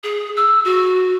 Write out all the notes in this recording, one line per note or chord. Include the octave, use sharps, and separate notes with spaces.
G#4
E6
F#4